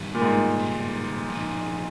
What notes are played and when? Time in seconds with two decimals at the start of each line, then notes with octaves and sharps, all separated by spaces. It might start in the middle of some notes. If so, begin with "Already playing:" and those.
Already playing: G2 D#3 G3
0.15 A#2
0.22 G#2
0.58 G2 D#3 G3
1.30 A#2 F3 G#3 D#4